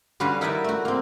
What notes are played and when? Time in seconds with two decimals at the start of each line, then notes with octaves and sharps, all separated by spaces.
0.20 D3 G3 C#4 F#4 B4 F5
0.41 D#4 E4 A#4 B4 D5 E5
0.64 A3 F#4
0.85 A#3 C4